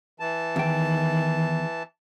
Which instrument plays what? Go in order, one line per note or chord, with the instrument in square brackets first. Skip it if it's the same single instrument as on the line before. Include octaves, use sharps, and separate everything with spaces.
[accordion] E3 A5
[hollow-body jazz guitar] E2 G5 [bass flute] D#3